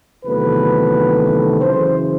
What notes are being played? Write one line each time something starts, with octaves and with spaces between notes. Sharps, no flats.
E2 C3 D#3 F#3 A3 B4
F#2 C#3 E3 C5